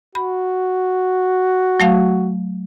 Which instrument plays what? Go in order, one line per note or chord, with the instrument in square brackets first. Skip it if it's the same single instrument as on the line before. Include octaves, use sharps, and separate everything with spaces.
[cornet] F#4 [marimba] B5
[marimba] F#3 A3 F5